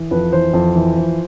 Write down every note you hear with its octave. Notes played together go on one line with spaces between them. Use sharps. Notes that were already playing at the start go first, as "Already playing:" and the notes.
Already playing: E3
F2 B4
E3 C5
F2
E3
F3